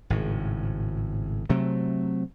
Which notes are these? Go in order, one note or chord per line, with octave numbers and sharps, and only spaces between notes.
G#1 A2 C#3
C3 F#3 A3